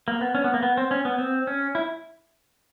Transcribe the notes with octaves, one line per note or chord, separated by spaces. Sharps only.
A#3
B3
C#4
B3
A#3
B3
C4
C#4
B3
C4
C#4
E4